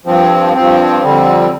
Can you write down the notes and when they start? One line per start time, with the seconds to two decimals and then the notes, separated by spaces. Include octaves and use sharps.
0.06 G2 F3 C4
0.54 G2 F3 C4
1.03 F2 D3 G3 C4